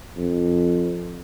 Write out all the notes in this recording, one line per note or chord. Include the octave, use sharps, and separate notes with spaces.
F2